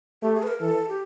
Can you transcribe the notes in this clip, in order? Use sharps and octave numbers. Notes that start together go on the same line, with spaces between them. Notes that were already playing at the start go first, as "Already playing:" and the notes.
A3 G4
G#4
B4
A#4
E3 A4
G4